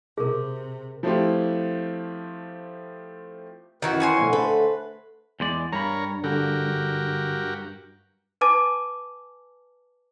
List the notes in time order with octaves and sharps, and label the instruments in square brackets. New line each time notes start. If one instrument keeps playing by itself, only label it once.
[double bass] C3 [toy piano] G#4 A#4
[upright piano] F3 A3 C4 E4 F4 G4
[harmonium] F#2 B4 [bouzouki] D#3 E3 F#4
[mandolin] C#5 G#5 C6
[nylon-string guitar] F2 B2 [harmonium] D3 A3
[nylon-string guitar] A4 C5 [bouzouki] B4
[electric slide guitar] E2 G#3 D5
[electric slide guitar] G2 [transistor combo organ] A#4 C#5 [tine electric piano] A#5 B5
[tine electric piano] D3 [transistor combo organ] F#4 G4 A#4
[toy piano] B4 G#5 A5 D6